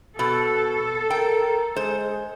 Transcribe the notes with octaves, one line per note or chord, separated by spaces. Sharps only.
B2 A4
A#4 G5
G#3 C5